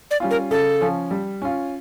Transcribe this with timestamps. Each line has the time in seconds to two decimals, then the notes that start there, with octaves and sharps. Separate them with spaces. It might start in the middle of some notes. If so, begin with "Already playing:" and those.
0.11 D5
0.20 G3 C#4 F4
0.31 A#4
0.51 C#3 A4
0.81 F3 C#4
1.11 G3
1.42 C#4 F4